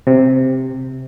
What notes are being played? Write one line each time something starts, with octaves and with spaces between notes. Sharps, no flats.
C3